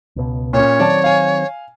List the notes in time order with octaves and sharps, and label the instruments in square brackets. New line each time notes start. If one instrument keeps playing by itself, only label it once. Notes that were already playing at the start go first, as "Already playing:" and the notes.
[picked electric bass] C#2 B2
[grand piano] A#2 C#4 [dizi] C#5
[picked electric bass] D#3 F#3 C4 [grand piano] D5 A5
[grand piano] F5 G#5